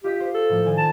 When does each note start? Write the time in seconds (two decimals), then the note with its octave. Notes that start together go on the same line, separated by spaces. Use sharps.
0.04 F4 G4 D#5 B6
0.20 C5
0.34 A4
0.49 A2 F3 A#3
0.66 D#3 D5 G#5
0.78 A5